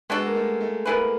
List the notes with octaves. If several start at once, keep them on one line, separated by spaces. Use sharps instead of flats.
G#3 B3 D4 F#4 A4
A#3
A3
A3
A#3 B3 E4 G#4 B4